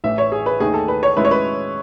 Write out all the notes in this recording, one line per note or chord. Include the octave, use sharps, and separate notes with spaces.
A1 A2 E3 E5
C#5
G#4
B4
D#2 D#3 A3 G#4
A4
B4
C#5
A2 G#3 C#4 E4 B4
C#5
B4